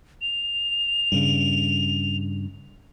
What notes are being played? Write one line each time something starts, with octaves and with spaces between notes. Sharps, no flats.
F7
G2 C#3